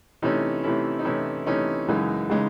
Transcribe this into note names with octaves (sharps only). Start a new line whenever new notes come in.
C3 E3 A3 C#4 D#4
C3 E3 A3 C#4 E4
D#4
C3 E3 A3 C#4 E4
C3 E3 A3 C#4 D#4
F#2 C#3 E3 G#3 D#4
C#3 E3 G#3 D#4